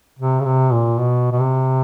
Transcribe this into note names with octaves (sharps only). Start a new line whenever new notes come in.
C3
C#3
C3
A#2
B2
B2
C3